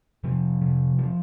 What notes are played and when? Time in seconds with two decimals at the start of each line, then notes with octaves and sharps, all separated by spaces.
0.24 C3 F3
0.61 C3
0.99 F3